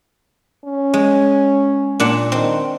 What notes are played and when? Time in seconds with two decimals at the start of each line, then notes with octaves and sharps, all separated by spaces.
0.65 C#4
0.94 G#3
2.00 A#2 D4 F#5
2.32 D#3 C4